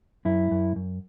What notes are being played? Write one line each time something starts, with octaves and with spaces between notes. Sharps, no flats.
F#2 E4
F#2
F#2